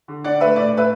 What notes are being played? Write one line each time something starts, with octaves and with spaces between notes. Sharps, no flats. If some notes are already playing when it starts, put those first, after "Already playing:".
D3
D4 D5 F#5
A3 B4 E5
A2 D5
A2 B4 E5